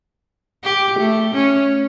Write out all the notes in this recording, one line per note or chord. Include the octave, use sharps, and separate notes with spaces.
G4
A3
C#4